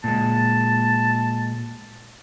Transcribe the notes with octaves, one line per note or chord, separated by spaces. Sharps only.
A#2 G#3 A5